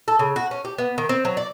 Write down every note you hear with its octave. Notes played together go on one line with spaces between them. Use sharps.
A4
C#3
F#4
C#4
G4
B3
D#3
C4
F#3
D5